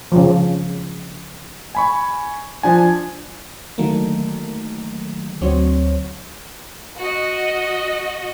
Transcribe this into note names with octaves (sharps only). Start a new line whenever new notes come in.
C#3 F3
G#5 B5 C#6
F3 D4 G#5
D3 D#3 F#3 A3 A#3
D2 D3 F#3 C4 C#5
F#4 D#5